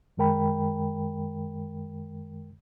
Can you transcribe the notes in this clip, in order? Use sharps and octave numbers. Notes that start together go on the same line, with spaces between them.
F#2 D#3 G#3 A#4 G5 B5